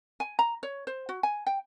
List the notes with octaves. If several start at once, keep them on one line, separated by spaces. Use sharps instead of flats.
G#5
A#5
C#5
C5
F#4
G#5
G5